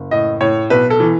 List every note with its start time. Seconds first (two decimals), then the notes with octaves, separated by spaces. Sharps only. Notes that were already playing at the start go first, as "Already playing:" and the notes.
Already playing: F#1
0.11 A2 D#5
0.41 A2 C#5
0.70 B1 B4
0.90 A4
1.00 E3